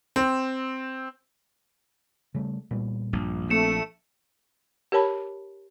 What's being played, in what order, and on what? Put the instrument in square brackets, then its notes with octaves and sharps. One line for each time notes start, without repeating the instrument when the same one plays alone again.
[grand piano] C4
[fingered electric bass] C#3 G3 A3
A#2 G3 B3
[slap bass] A#1 [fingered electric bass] G2
[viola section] A3 [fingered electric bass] C4 [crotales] C#7 E7
[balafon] G4 A#4 C#5 A5 B5